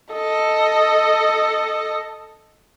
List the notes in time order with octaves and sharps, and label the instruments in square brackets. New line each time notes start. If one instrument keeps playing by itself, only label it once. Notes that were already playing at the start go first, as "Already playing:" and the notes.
[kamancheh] A4 D#5